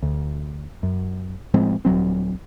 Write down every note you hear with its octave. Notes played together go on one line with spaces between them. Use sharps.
D2
F#2
A2 F3 G#3 C4
D#1 G#1 F#3 C4